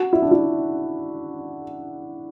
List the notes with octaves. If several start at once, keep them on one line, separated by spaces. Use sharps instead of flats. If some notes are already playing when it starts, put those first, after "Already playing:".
Already playing: F#4
E4
D4
E4